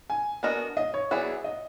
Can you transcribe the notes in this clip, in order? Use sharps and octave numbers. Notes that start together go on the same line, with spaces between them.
G#5
B3 D4 F#4 A#4 D#5
D#5
C#5
F#3 B3 E4 G#4 D5
D#5